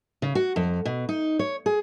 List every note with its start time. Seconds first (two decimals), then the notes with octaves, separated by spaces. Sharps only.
0.22 C#3
0.35 F#4
0.56 F2
0.85 B2
1.09 D#4
1.39 C#5
1.66 G#4